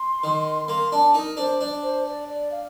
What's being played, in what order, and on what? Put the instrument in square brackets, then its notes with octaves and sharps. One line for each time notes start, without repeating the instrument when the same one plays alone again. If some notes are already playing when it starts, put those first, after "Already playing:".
Already playing: [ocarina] C6
[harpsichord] D#3
[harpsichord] A#3 [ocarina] C6
[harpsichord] D4 [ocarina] A5
[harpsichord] D#4 [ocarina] A#4
[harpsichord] D4 [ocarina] C5
[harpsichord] D4
[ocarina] C5
D5
D5
F5